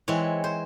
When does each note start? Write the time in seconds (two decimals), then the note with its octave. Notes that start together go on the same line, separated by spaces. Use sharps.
0.08 E3 G#3 C4 C#5
0.44 C5